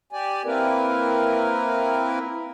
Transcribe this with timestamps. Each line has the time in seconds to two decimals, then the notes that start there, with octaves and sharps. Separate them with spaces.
0.12 G4 D5 G#5
0.45 A#3 C4 E4 A#4 B4